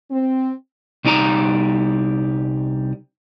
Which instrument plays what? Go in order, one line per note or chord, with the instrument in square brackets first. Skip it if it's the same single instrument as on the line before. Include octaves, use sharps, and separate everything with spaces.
[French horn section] C4
[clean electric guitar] C2 G3 D#4 D5 A#5